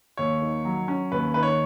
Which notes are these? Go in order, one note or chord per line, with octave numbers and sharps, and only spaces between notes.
D#2 C#5
D#3
F#3
C#4
D#2 B4
D#3 B4
C#5